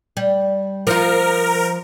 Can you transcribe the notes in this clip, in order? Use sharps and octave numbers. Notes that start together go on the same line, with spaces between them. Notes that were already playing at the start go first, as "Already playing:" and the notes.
G3
F3 F4 A#4